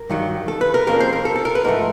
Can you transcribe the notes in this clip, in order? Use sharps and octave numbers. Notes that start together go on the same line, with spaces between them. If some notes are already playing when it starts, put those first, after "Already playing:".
Already playing: A#4
G2 D#3 F#3
A4
B4
A#4
F2 C#3 F3 A#3 A#4
C5
A#4
A4
A4
A#4
B4
G#2 F3 A3 A#4